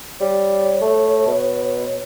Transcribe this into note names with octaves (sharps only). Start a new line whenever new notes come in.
G3 C#5
A3
B2